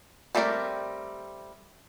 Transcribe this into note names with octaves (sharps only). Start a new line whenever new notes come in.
G3 A3 C4 A#4 D5